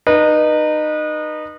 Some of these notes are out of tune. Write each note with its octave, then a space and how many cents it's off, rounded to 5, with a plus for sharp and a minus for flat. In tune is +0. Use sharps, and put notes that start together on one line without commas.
D#4 -25 B4 -30